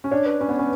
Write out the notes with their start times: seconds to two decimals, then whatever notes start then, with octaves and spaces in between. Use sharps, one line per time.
0.04 C#4
0.11 D4 C#5
0.26 B4
0.40 C#4 B4
0.49 B3 C#5
0.58 C#4 B4